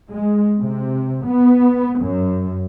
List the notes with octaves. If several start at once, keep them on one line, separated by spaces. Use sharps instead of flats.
G#3
C3
B3
F#2